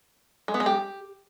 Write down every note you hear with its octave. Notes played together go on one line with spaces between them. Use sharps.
G#3
B3
G#3
G4